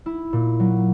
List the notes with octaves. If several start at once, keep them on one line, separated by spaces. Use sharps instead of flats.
E4
A#2
F#3